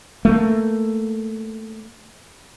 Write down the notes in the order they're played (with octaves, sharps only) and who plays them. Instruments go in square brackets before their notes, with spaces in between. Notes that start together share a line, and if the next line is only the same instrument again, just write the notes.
[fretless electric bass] A3 A#3